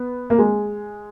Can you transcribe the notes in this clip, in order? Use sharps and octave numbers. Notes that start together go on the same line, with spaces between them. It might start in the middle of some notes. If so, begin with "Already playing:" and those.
Already playing: B3
A#3
G#3